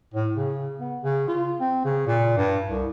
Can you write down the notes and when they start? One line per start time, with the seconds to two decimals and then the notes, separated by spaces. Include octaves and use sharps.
0.14 A2
0.36 C#3
0.80 B3
1.02 C#3
1.28 F4
1.60 C4
1.85 C#3
2.07 A#2
2.37 G2
2.70 C2